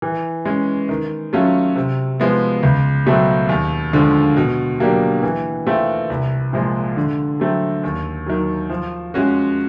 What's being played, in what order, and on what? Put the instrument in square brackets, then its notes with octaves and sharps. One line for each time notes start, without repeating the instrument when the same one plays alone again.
[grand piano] E3
G#3 C#4
D#3
F#3 A3 C#4 F4
C3
F3 G#3 B3
C#2
B2 F#3 A3 C4
D#2
D3 F3 G#3
B2
F#3 A#3 D4 G4
E3
A3 C4 F4
C2
A#2 F3 G#3
D3
F#3 A3 C4
D#2
D#3 F#3
F3
G#3 C#4 F#4